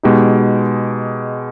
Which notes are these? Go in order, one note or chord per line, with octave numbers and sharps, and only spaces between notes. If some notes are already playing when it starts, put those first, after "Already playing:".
B2 G#3 D#4 G4